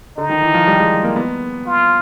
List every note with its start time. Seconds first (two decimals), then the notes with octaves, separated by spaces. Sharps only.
0.17 D3 D#4
0.30 D#3
0.42 E3
0.54 F3
0.67 G3
0.80 G#3
1.04 A#3
1.16 B3
1.66 F4